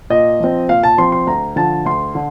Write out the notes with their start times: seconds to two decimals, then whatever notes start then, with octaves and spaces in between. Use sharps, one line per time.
0.10 A#2 D#5
0.40 F3 C4
0.69 A#2 F5
0.83 A5
0.98 F3 C4 C6
1.12 C6
1.27 D2 A#5
1.56 D3 F3 A5
1.85 D2 C6
2.15 D3